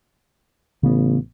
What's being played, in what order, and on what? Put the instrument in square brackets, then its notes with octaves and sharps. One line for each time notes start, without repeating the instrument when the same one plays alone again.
[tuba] A1 [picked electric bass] C#3 B3